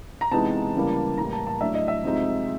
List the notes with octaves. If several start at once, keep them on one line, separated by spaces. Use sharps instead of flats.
A#5
C3 E3 G#3 B3 D#4 A5
C#3 E3 G3 A#3
A2 E3 G3 A#3 A#5
A5
A5
A2 F#3 A3 D4 E5
D#5
E5
C3 F3 G#3 C4 D#4